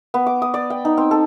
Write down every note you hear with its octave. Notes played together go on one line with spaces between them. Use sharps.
B3
D6
D#6
D5
G5
D#4
C4
A4